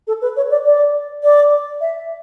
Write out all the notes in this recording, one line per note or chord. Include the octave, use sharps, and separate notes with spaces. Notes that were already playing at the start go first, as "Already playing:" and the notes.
A4
B4
C#5
D5
D5
D5
E5